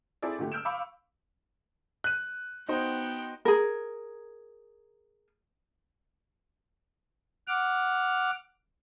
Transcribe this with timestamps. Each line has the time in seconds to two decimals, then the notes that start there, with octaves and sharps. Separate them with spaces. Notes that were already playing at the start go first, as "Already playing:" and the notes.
0.22 C4 E4 G#4 A4 C5 D5
0.39 A#2 D3 A3 G4
0.52 E6 F6 G6 D7 E7
0.65 F5 B5 C#6 D6 E6
2.04 F#6 D#7
2.69 B3 D#4 F#4 C5 G5
3.45 G#4 A#4
7.48 F#5 D6 F6